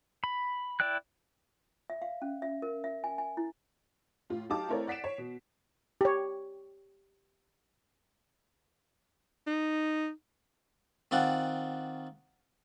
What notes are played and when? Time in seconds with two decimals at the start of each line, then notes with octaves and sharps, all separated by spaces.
0.24 B5
0.80 E4 D5 G5 F#6
1.90 E5
2.02 F5
2.22 C#4
2.42 E5
2.62 A#4
2.84 E5
3.04 G#5
3.18 G#5
3.37 E4
4.30 A2 F4
4.50 F#3 D#4 G4 F5 A5 D6
4.69 A3 C4 E4 A#4 C#5 D5
4.87 D5 F#5 B6 C7 D7 E7
5.04 C#5
5.18 B2
6.01 G4 C#5
9.47 D#4
11.11 D#3 C4 F4 D5 F#5